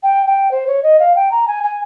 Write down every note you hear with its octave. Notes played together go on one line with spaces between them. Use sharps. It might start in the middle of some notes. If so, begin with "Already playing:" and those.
G5
G5
C5
C#5
D#5
F5
G5
A#5
G#5
G#5